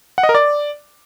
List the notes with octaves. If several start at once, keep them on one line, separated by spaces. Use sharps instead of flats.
F#5
D#5
A#4
D5